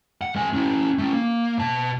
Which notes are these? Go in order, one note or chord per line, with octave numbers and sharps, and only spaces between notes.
F#5
A3 G#5
C#4 E4
A3 C#4
A#3
B2 A5